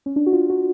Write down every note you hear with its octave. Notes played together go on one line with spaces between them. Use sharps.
C#4
D4
F#4
F4
F#4